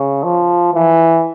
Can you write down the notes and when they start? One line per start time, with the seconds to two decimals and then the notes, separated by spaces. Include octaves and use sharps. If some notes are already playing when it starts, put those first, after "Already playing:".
Already playing: C#3
0.23 F3
0.74 E3